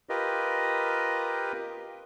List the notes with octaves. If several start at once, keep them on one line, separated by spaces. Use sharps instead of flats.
F4 G4 A#4 B4 D#5